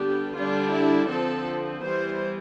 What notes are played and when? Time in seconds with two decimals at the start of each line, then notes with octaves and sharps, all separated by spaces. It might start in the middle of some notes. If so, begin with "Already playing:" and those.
Already playing: D3 G3 B3 D4 G4
0.34 D3 G3 D4 F4
0.71 E4
1.08 D3 F3 C4 A4
1.82 E3 G3 B3 C5